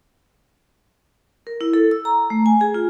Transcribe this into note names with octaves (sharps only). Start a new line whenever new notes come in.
A#4
E4
A4
E6
A#5
A3
G#5
G#4
F4